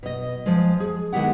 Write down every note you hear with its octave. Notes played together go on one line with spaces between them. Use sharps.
B2 D#5
F3 G#3
G#4
D#3 G#3 B3 E4 G4 F#5